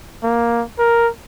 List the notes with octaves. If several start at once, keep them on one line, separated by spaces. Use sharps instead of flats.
A#3
A#4